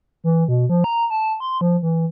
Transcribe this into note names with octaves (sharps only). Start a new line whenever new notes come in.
E3
B2
F3
A#5
A5
C6
F3
E3